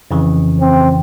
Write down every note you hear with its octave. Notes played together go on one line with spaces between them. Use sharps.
F2 C#3 E3
C4